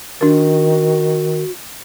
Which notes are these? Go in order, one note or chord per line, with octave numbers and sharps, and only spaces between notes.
D#3 D4 F#4 A#4